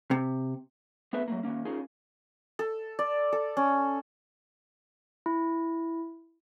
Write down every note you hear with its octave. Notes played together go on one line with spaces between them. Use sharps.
C3
A3 B3 G#4 B4 E5
F#3 A3 A#3
D#3 F3 A#3 C#4
C#4 D#4 F4 G#4 A#4
A4
D5
A4
C#4
E4